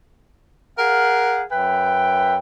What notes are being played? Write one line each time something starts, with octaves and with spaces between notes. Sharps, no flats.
G#4 A#4 F5 F#5
F#2 B4 E5 G5